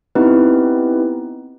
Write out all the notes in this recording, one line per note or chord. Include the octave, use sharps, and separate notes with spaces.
B3 C4 D#4 E4 G4 B4